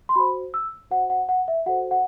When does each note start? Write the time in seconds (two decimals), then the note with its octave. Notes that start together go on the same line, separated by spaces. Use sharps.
0.09 C6
0.16 F#4 C5 B5
0.54 E6
0.91 F#4 C5 F#5
1.10 F#5
1.29 F#5
1.48 E5
1.66 F#4 A4 C5 F#5
1.91 F#5